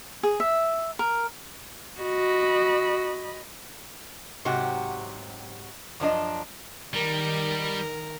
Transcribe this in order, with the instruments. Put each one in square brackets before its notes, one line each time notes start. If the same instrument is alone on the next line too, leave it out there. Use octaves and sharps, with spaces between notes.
[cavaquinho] G#4
E5
A#4
[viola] F#4 [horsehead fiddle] D#5 B5
[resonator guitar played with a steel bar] G#2 C3 F#3 F#4 G4
F#2 F3 D4 D#5
[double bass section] D#3 [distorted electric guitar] G3 [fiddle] A#4